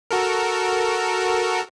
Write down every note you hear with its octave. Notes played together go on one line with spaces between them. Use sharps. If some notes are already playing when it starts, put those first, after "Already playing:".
F#4 A4 A#4